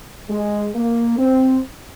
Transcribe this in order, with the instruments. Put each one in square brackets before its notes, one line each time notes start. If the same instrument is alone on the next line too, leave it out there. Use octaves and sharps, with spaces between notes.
[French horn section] G#3
A#3
C4